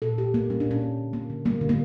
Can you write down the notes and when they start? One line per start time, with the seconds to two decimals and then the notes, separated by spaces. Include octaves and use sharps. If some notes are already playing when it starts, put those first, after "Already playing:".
0.02 A#2 A4
0.18 A#3 G4
0.34 A#2 A#3
0.50 G3 C#4
0.60 D4
0.66 A#2
0.71 C#4
0.82 A#3
0.98 D3
1.13 A#3
1.30 D3
1.45 G3 A#3
1.61 D3
1.69 A#3